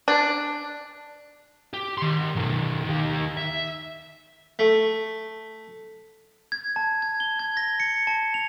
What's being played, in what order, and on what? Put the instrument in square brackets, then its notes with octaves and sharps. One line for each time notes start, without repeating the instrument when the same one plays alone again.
[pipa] D4
[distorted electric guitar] G4
D#3 C6
B1 D#3
D#3 G4
E5
[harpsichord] A3
[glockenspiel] G#6
A5
G#6
G7
G#6
A#6
C#7
A5
F7